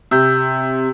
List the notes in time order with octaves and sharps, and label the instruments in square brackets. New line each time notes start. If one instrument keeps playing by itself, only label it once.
[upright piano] C3 [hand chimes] E6 G6